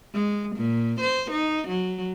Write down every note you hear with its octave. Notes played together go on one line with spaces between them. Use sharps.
G#3
A#2
C5
D#4
F#3